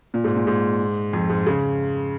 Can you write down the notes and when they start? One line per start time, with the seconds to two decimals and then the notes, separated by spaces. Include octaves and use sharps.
0.14 A#2
0.24 G#2
0.36 A#2
0.47 G#2
1.13 F2
1.30 G#2
1.47 C#3